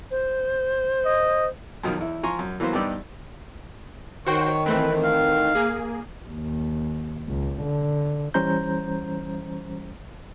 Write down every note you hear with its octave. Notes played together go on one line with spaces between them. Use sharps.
C5
D#5
F#2 B2 D#3 F3
E2 E4
F3 G#5 A#5 C6 C#6
F#2
E3 F#3 A#3 B3 C5
G2 B3 D#4 G4 D5 E6
D#3 F#4 C5 C#5 G5
E3 A3 C4 B4
F5
A#3 G#4
D#2
C#2
D3
E3 G3 C#4 C5 A#5 G6